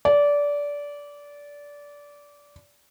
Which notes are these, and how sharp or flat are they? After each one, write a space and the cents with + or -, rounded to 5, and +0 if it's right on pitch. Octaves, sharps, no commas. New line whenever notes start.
D5 -20